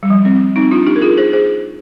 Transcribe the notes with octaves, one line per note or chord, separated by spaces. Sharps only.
G3
F3
C4
C4 D#4
D4 F4
D#4 G4
A#4
F4 G#4
G#4 C5
G#4 C5